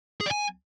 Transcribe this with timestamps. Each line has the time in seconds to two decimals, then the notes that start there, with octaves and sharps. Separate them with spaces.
0.21 G#4
0.26 D5
0.31 G#5